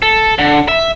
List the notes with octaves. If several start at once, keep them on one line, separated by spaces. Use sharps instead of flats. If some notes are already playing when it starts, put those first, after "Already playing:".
A4
D3
E5